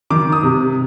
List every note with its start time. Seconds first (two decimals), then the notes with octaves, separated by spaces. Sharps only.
0.10 D#3 D6
0.32 D#6
0.43 C3